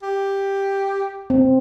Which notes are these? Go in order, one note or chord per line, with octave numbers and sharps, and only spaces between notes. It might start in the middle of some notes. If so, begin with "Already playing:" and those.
G4
C4